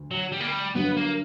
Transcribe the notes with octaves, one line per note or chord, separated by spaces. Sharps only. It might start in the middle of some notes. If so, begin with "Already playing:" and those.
Already playing: D2
F#3
G3
A#3
G3
G2 D3 F#3 B3
A#3